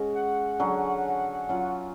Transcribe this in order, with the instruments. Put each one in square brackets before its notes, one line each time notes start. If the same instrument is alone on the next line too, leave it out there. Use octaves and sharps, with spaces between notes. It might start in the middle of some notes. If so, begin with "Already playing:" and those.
Already playing: [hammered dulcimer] G#3 C#4 F#4
[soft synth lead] F#5
[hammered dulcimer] D3 F#3 C#4 G#4
F#3 C#4 F4